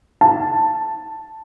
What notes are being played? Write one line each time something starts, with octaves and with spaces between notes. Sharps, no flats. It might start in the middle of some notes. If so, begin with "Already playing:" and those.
A5